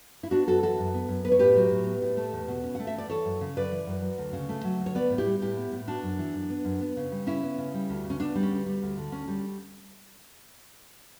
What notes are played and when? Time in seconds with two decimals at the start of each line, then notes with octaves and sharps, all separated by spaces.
0.23 E4
0.31 B3 D4 F#4
0.47 F#2 F#4 A4
0.63 E3 F#4 A4
0.79 F#2
0.94 B3
1.08 F#2
1.24 B3 B4
1.32 C#5
1.39 A2 G4 B4
1.56 F#3
1.71 A2
1.87 B3
2.02 A2
2.17 A3
2.32 E2
2.48 B2
2.63 C#4
2.75 A3 F#5
2.87 E5
2.94 E2 D5
3.10 E3 A4 C#5
3.25 F#2
3.41 C#3
3.56 F#2 B4 D5
3.72 E3
3.87 F#2
4.02 F#3
4.18 D2
4.33 C#3
4.49 A3
4.64 F#3
4.80 D2
4.86 C#5
4.95 B3 B4 D5
5.10 A2
5.18 E4 G4
5.26 G3
5.42 A2 E4 G4
5.57 B3
5.72 A2
5.87 B3 D4 F#4
6.03 F#2
6.19 E3
6.34 F#2
6.50 B3
6.65 F#2
6.81 B3
6.97 C#3
7.12 G3
7.27 C#3 C#4 E4
7.43 B3
7.58 C#3
7.74 G3
7.89 D2
8.04 C#3
8.10 C#4
8.20 B3 D4
8.35 G3
8.43 C#4
8.51 D2
8.66 G3
8.82 D2
8.97 D3
9.12 D2 C#4
9.28 G3